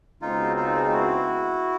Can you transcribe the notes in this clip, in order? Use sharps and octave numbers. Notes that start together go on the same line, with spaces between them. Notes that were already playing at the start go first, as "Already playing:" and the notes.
C#2 B2 G#3 C4 D#4 F4
D#4 F4
F4
E4 F#4